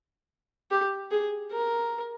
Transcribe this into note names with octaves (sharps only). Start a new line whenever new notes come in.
G4
G#4
A#4